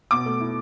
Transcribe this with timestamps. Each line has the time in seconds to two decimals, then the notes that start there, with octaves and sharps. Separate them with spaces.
0.11 B2 D6
0.26 A3
0.40 E4